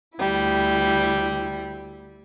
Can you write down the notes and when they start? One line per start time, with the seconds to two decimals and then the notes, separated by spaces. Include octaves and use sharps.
0.19 D2 G3 E4